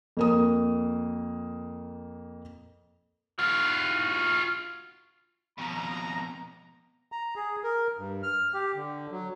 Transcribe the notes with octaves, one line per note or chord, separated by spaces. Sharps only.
F2 A#3 D#6
F4 F#4
F2 B2 A#5
A#5
G#4
A#4
G2
F6
G4
D3
F#3